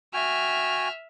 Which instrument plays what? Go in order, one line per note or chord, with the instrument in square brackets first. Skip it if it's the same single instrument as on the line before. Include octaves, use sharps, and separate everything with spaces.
[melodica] F#4 G5 G#5 [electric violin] E5 F6